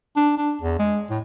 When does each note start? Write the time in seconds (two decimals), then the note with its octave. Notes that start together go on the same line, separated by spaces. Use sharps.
0.16 D4
0.38 D4
0.61 E2
0.79 G#3
1.10 A2